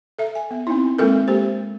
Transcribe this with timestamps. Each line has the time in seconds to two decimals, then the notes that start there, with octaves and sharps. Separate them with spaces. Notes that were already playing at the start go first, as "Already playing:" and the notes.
0.18 A4 E5
0.35 G#5
0.51 B3
0.67 C4 D#4 E4
0.99 G#3 A#3 C4 F4 A4 A#4
1.28 G#3 A#3 G4 C5